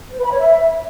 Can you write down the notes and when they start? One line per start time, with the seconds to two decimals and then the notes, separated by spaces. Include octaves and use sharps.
0.10 C5
0.17 B4
0.24 B5
0.32 C#5
0.39 E5